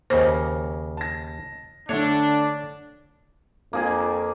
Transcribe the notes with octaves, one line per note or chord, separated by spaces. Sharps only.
D#2 C#3 A#3 C5
A5 A#6
D3 A3 D4 C#5
F2 A#3 G#4